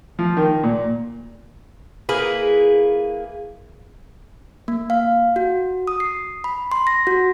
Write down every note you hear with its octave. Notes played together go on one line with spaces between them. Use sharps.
F3
D#3
A#2
A#3 E4 G#4 B4
A#3
F5
F#4
D#6
C7
B5
C6
A#6
F#4